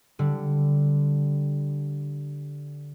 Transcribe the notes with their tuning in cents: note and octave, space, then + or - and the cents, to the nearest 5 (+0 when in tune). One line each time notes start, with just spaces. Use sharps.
D3 -15 G3 -10